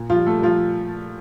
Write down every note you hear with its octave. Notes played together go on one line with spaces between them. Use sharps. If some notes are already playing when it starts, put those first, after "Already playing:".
Already playing: A#2
F3 F4
G3
A3 A4
G3
F3 F4